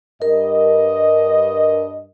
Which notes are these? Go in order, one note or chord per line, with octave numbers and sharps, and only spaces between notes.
G2 A#4 D#5